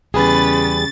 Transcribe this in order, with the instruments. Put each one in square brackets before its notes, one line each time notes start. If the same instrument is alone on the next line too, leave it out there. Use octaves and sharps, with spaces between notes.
[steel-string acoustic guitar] E2 G3 G#4 [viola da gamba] C#3 [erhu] B4 [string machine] A6